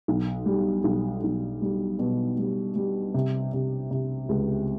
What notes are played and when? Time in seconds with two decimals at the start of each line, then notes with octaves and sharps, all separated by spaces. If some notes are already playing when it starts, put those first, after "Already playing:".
0.08 B1
0.46 G3
0.84 B1
1.24 B1
1.62 G3
1.99 B2
2.38 G3
2.76 G3
3.14 C3
3.53 C3
3.91 C3
4.29 C#2